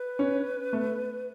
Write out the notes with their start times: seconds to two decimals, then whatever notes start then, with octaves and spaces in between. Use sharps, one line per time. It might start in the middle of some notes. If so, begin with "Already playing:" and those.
Already playing: B4
0.19 C#4
0.73 A3